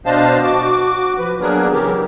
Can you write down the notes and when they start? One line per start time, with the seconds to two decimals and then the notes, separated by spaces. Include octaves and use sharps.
0.06 B2 D4 C5 D#5 F5 A5
0.43 F#4 D6
1.18 F3 B4
1.41 F#3 A#3 B3 D4 G#4 A#4
1.73 C#3 E3 F#3 G4 A#4